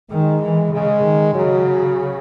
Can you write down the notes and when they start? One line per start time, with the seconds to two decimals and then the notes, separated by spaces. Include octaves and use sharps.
0.11 D#3 G#3
0.43 E3
0.73 C#3 G#3
1.04 D#3
1.35 C#3 F#3